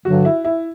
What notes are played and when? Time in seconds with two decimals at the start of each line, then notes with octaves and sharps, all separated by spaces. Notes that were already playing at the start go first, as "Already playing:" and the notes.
0.05 G2 D3 F#3 F#4
0.25 E4
0.44 E4